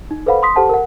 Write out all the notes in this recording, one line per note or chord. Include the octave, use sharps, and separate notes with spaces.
D#4
A4 B4 C5 F5 F#5 B5
C6 D#6 B6
G4 A4 C5 F#5 A5
A#4 F#5